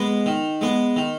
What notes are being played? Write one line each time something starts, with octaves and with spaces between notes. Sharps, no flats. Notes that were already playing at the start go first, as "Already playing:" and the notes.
Already playing: G#3 B3
D#3
G#3 B3
D#3